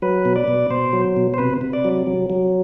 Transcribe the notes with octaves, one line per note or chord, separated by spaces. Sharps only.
F#3 B4
B2
D5
B2
B2 C5
F#3
B2
C5
C3 B4
C3
D5
F#3
F#3
F#3